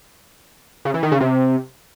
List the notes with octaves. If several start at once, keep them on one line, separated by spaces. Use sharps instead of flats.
C#3
E3
D#3
C#3
C3